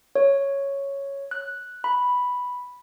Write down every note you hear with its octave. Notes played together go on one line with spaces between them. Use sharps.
C#5
F#6
B5